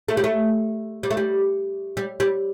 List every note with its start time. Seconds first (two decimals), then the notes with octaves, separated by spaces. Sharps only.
0.09 A3
0.17 G3
0.24 A3
1.03 G3
1.11 A3
1.17 G3
1.97 G3
2.20 G3